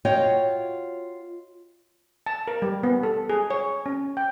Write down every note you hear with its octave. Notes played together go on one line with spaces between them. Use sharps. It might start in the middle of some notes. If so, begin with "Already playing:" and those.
F4 F#4 C#5 D#5 F5 G5
A5
A#4
G3
B3
A4
G#4
C#5
C#4
G5